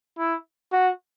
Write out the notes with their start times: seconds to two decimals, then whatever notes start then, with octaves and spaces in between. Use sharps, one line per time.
0.19 E4
0.73 F#4